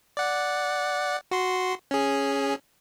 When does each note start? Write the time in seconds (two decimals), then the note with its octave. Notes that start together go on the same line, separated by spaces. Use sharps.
0.17 D5 F#5
1.31 F#4 C6
1.91 C#4 G#4